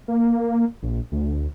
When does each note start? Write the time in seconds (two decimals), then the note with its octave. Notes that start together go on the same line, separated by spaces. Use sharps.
0.08 A#3
0.83 A#1
1.12 D2